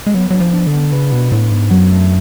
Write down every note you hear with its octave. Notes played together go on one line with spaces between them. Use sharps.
G#3
F#3 B3
F#3 D4
F3
D4
D3
B3
C#3 B4
B2 B3
A2 B3
G#2 B3
F#2 F#3
A3